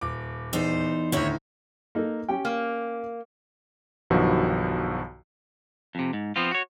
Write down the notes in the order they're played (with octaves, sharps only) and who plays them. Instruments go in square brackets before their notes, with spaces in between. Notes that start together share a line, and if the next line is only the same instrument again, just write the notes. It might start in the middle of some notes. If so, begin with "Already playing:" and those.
[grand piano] D#1 D6
[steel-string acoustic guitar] E2 D#4 C5
[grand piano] D2 A2 D#3 [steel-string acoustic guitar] E4 C#5
[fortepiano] A#3 D#4 A4
C#4 G4 G5
[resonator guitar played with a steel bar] A#3
[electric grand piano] B1 G2 D#3 F3 F#4
[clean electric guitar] F2 C3
G#2
F3 B3 C4 F4
F#4 C#5